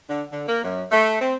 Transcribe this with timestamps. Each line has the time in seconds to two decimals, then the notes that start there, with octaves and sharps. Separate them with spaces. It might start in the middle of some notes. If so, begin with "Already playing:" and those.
0.09 D3
0.32 D3
0.48 A#3
0.64 F#2
0.91 A3
1.20 C4